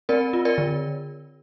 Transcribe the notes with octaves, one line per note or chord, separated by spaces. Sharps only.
C4 A#4 D5
F4
A#4 D5
D3